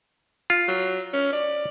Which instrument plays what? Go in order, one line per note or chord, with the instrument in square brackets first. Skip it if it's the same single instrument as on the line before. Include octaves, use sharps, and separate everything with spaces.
[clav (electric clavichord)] F4
[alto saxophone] F#3
C#4
D5